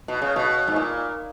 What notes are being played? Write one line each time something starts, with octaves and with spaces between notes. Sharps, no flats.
B2
C#3
B2
G#2
A#2